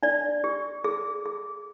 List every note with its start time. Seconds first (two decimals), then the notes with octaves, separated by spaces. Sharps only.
0.03 D4 D5
0.44 G4
0.84 G#4
1.25 G#4